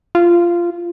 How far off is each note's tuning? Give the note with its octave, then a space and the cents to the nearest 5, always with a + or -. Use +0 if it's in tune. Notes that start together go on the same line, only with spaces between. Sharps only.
F4 -15